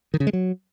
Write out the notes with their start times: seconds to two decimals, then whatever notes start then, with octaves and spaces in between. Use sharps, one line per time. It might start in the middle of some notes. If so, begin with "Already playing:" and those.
0.14 D#3
0.20 C#3
0.27 G#3
0.33 F#3